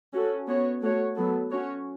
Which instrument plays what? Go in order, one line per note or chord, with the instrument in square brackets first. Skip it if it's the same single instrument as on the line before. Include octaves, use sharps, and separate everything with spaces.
[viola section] C#4 F#4 A4
B3 F#4 C#5
A3 F#4 C#5
F#3 B3 A4
C#4 F#4 C#5